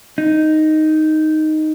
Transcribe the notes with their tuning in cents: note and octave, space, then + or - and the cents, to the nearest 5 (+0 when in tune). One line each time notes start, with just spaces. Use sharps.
D#4 +0